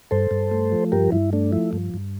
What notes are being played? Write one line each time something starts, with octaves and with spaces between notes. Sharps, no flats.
G2 A4 C5
G2
A3
F3
G2 G4 A#4
G2 E4
A3 D4
F3 E4
G2
G2